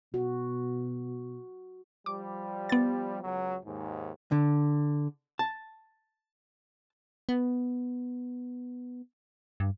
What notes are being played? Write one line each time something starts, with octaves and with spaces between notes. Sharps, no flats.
B2 F#4
F3 G3 D6
B3 A6
C#2 F#3
D#2 G#2
D3
A5
B3
G2